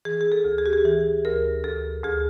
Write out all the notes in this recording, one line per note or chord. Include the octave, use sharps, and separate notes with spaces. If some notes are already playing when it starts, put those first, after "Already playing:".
E3 G#4
G#4
A4
D2
G#4
G4
G#4
E3 G#4
D2 A#4
D2 A4
D2 G#4